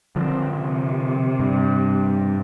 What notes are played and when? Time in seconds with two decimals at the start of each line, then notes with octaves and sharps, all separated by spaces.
0.16 D3 F3 C4
0.56 C3
1.40 G2